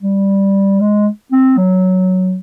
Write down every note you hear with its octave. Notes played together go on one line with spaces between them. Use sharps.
G3
G#3
C4
F#3